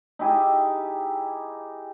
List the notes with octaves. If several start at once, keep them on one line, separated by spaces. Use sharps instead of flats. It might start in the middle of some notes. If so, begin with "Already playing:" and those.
D#4 E4 G4 G#4